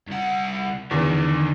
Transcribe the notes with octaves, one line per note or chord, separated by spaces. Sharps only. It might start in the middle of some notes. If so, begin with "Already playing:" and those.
C2 F#5
E2 D3 D#3